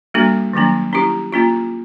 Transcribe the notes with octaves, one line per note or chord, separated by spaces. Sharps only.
G3 A#3 D4 F#4 A4
D#3 F#3 A#3 D4
C#4 E4 G4
A#3 C#4 F4